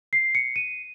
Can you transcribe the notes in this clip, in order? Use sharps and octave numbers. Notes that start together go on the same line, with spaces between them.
C7
C#7
D#7